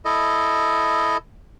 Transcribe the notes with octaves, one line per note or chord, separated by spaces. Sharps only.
E4 A4 D#5